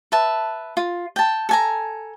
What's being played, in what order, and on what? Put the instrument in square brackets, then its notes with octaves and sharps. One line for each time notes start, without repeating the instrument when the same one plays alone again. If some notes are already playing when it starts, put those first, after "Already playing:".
[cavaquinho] B4 E5 A5
F4
G5 A5
A4 G#5 A#5